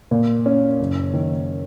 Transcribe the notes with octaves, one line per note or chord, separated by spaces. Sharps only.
A#2
C#4
F#1
D#3